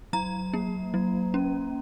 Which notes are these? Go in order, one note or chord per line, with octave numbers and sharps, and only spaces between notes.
F#3 A#5
A#3
F#3
C#4